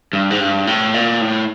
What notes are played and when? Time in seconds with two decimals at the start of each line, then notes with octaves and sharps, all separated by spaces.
0.13 G2
0.30 G#2
0.40 G2
0.67 A2
0.94 A#2
1.21 A2